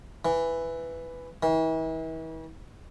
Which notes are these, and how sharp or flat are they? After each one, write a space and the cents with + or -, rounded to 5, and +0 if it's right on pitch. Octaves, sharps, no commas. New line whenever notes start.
E3 +5
E3 -40